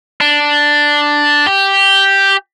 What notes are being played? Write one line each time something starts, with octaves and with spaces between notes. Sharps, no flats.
D4
G4